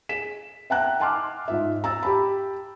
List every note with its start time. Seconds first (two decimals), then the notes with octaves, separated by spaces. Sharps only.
0.09 G#4 B6 E7
0.70 E5 F#5 G5 A5 A#5 F#6
1.00 F#5 G#5 A5 C6 D6 F6
1.48 G#2 F4 E5
1.84 A#5 E6 A6
2.03 G4 A5 B5